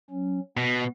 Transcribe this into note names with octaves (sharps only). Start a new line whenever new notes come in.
F#3 C#4
B2 B3